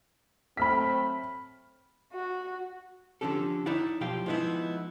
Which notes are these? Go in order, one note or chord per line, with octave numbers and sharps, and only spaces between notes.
F#3 A3 C4 B5 F6 B6
F#4
D3 F3 C#4 G4 A4
D#4 E4 C#5 D5 F#5
B1 F3 G4 F5 G5 C6
F3 G#3 B3 D#4 E4